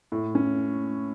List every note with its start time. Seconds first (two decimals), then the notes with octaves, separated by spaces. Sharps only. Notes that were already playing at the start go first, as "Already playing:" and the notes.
0.12 A2
0.35 C#4